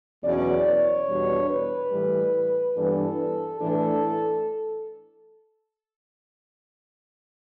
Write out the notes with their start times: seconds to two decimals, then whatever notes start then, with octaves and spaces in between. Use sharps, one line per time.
0.22 E2 B2 F#3 C#4 D5
0.65 C#5
1.07 E2 B2 G3 D4
1.48 B4
1.90 A2 E3 G3
2.75 G2 E3 B3 D4 A4
3.59 A2 E3 A3 D4 A4